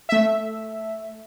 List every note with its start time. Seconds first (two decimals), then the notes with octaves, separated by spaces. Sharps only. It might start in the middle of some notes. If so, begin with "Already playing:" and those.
0.09 A3 E5